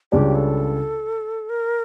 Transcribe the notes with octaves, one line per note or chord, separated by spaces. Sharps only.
C#2 C#3 G3 D4 G4
A4
A#4